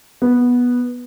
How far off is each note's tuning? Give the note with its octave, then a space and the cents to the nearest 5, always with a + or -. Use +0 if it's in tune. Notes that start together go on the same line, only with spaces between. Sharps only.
B3 -10